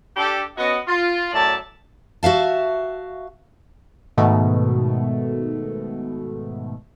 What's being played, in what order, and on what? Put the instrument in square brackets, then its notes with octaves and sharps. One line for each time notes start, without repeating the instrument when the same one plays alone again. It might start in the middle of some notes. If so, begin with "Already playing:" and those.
[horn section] D4 G4 A4
B3 C#4 F#4 D#5
F4
F#2 A2 D5 E5 A5
[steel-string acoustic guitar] F#4 E5 F5 A5
[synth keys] G#2 B2 D#3 A3